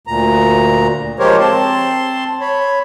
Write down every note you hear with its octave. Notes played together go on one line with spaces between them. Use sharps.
D2 A#2 A#5
F3 G#3 G4 A#4 C5 C#5
C4 A5 C6
C#5 B5